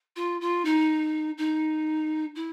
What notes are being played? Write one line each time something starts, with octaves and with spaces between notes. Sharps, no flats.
F4
F4
D#4
D#4
E4